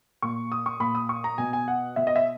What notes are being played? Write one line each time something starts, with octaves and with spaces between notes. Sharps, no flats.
A#2 C#6
D#6
C#6
A#2 B5
D#6
C#6
A#5
B2 G#5
G#5
F#5
B2 E5
D#5
E5